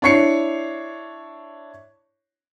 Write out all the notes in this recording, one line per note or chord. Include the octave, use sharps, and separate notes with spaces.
D4 E4 C#5 C7 C#7